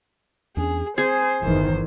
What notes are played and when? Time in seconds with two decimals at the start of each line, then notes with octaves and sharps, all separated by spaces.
0.57 E2 C#4 D4 G#4
0.98 C4 G#4 C5
1.43 D1 G1 E2 D#3 E3 C5